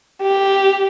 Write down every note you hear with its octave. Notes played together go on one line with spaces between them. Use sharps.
G4